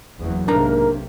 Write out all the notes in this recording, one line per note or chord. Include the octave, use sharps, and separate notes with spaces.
F#1 E2 F#3
B1 G#2 C3 A#3 D4 A#4 A#5